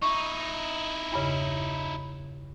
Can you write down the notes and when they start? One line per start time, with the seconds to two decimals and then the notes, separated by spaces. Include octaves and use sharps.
0.02 D#4 E4 C#6
1.12 E2 G2 C#3